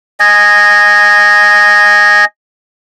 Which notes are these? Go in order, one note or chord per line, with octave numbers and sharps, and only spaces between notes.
D#5 G#5